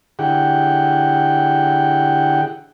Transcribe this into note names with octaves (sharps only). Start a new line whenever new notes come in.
D3 E4 G4 G#4 F#5 G5